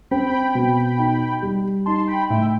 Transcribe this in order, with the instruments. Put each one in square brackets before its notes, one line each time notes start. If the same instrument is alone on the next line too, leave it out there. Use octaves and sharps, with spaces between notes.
[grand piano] C4 [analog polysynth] G5 B5
[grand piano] B2
D#4
G3
[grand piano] D#4 [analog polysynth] A5 C6
[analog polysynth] G5 B5
[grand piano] A2 [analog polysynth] E5 G5